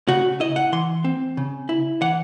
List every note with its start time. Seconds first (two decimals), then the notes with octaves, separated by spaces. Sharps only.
0.08 C#3 F#4
0.40 E4 D#5
0.56 F#5
0.72 E3 C6
1.04 C4
1.37 C#3
1.69 E4
2.01 E3 F#5